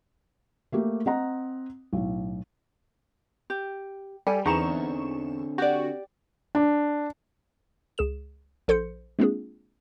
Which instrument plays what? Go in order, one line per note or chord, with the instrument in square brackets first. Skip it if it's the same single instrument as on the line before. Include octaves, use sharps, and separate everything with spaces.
[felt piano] A3 A#3 G4
C4 D#5 F#5 A#5
B1 A2
[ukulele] G4
[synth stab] G3 [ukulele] A4 G#5
[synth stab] E2 C#6 E7 [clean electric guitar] D3 C4 [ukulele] D#4 A#5
[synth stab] F#4 [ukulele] G4 D5
[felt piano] D4
[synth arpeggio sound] C#2 G#4 E7
A#1 A4 C5 C6 G6 C#7
G#3 A#3 C4 D4 F4 G#4